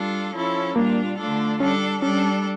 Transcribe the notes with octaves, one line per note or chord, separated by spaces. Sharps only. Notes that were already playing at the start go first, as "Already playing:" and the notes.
Already playing: G3 D4 F4 A4
F3 C#4 E4 A4
A#2 G3 A#3 D4 F4
D3 A3 D4 F4 A4
G3 C#4 D4 A4
G3 C#4 D4 A4